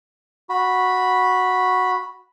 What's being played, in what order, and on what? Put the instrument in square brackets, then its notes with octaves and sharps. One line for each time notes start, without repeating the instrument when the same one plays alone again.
[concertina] F#4 B5